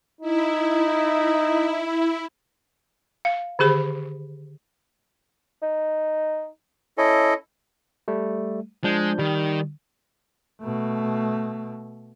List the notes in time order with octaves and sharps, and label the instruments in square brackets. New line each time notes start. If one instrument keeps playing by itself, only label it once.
[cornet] D#4 [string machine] E4
[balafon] F5
D3 D#3 G4 G#4 B5
[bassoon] D#4
[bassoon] C#4 [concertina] E4 A4 D#5
[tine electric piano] G3 A3
[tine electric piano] F3 D4 G6 [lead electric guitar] G#3
[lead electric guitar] D#3 [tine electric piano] G3
[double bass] B2 A3